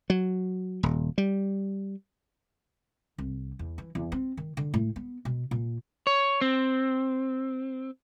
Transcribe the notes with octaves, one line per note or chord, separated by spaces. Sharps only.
F#3
D#1
G3
C2
E2
E3
E2
C4
D#3
D3
A2
B3
B2
A#2
C#5
C4